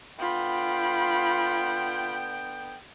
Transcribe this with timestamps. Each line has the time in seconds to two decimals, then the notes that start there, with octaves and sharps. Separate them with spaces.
0.19 D3 B3 F4 G5 B5